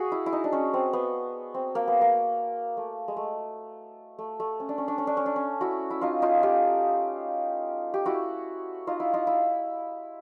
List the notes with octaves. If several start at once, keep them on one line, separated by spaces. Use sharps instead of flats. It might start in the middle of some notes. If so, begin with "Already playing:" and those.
Already playing: F#4 G#4
E4
E4
D#4
D4
C#4
C4
B3
C4
A#3
B3
A#3
A3
G#3
A3
A3
A3
C#4
D4
C#4
D4
C#4
D4
C#4
D4
C#4
E4 F#4
E4
D#4 F4
D#4 F4
F4 G4
G4
E4 F#4
D#4 F4
E4
D#4 F4
E4